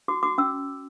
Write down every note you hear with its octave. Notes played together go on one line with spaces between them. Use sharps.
F#4 D6
F#4 D6
C#4 E6